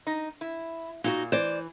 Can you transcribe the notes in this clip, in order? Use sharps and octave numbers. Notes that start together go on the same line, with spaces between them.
D#4
E4
A#2 D#4 F4 F#4
E3 C5 D5